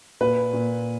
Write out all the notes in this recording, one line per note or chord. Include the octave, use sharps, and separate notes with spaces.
A#2 B4
A#2